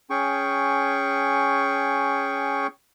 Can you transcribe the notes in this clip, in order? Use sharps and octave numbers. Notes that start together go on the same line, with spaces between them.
C#4 G#4 G5 C#6